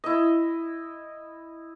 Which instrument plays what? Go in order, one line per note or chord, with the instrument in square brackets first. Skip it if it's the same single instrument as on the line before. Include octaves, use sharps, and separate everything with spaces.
[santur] E4 D#5